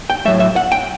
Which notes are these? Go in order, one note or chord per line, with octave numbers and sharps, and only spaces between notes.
G5
A2 F#3 A3 E5
E5
F#5
G5